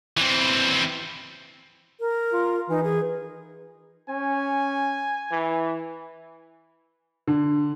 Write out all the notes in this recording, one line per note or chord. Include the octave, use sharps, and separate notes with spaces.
E3 C4
A#4
F4
E3 D#4
G#4
C#4 G#5
E3
D3